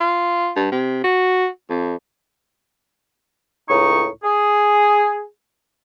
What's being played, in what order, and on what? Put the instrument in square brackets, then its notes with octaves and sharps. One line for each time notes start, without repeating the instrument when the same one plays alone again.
[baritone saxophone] F4
G2
C3
F#4
F2
[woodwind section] C#2 A2 D#4 C#6
G#4